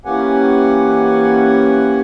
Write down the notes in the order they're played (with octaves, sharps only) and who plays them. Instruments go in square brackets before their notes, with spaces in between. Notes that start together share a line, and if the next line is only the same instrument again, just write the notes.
[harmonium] E3 A#3 C#4 G4 F#5 G#5